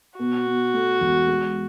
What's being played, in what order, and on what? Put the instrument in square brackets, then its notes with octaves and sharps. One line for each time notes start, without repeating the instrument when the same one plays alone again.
[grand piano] B2 [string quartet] F#4
[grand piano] B2
A3
E1
G#3